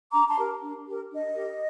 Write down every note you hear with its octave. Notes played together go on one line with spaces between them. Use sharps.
D4 A#5 D6
A5 C6
G4 A#4
D4
G4 A#4
D4 D#5
G4 A#4